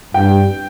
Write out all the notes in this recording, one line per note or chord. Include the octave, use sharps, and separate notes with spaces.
G2 G5